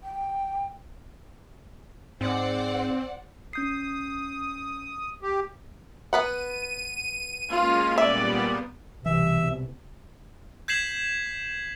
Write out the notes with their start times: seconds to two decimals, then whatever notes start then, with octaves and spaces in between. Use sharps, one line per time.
0.03 G5
2.21 G#2 C4 C5 D5 F#5
3.53 C#4 D#6 G6 C7
5.22 G4
6.13 B3 B4 F#5 D#7
7.51 G#3 A#3 C#4 F4
7.98 A#2 G3 B3 D5 E5
9.06 C2 B2 E3 E5
10.68 G6 G#6 B6 C7 E7 F#7